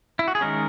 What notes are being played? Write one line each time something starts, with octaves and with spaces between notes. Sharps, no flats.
E4
F#4
G#4
D#3 G#3 C#4 A#4